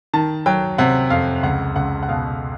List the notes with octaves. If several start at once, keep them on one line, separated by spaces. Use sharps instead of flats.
D#3 A5
F#3 G5
C3 F#5
F2 F5
C#2 F#5
C#2 F#5
F#5
B2 F5